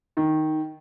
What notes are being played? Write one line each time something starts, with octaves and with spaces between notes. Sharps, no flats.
D#3